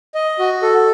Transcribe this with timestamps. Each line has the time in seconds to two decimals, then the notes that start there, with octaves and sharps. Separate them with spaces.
0.15 D#5
0.39 F#4
0.62 A4